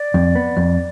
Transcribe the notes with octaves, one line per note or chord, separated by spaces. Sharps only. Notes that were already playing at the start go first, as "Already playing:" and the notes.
Already playing: D5
F2
B3
F2